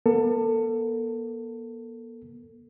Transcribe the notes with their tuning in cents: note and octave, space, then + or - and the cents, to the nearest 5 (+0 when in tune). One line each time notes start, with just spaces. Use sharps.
A#3 +45 A4 +25